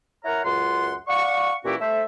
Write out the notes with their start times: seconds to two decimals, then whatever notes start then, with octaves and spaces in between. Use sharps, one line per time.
0.25 E4 A#4 C#5 F#5 A#5
0.45 C#2 F#2 F4 F#5 C6
1.08 D5 F5 F#5 C#6
1.65 A#2 E3 C#4 E4 F#4 G4
1.80 A3 C5 E5